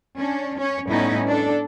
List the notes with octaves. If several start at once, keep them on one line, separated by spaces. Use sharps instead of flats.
C#4 D4
C#4 C#5
A2 G3 B3 C#4 D#4 E4
D4 A4